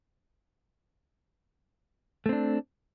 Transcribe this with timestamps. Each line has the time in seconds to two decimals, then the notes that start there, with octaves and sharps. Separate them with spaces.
2.26 A3
2.29 C4
2.33 D4